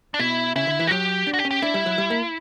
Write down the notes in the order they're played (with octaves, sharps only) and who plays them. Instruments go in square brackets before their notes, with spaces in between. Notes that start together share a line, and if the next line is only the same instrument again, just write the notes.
[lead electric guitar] D4
[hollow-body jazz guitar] B2 [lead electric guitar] E4
[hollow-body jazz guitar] C#3 [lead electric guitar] E4
[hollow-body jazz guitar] D3
E3
[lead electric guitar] F#4
[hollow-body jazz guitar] F#3 [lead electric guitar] G4
[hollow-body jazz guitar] D4
[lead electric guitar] F#4
G4
[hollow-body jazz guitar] C#4
[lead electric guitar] G4
[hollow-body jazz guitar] D4 [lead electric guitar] E4
[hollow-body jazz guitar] G3
F#3
G3
A#3